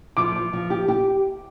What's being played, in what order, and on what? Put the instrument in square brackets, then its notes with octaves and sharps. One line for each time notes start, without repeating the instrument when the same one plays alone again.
[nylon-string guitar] F3 [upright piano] D6
[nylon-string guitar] F3
F3
G4
G4